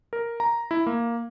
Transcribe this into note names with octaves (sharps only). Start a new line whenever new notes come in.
A#4
A#5
E4
A#3